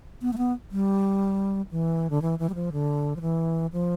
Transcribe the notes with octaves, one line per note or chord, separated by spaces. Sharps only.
B3
A3
B3
G3
E3
D3
E3
E3
G3
F3
D3
F3
E3
F3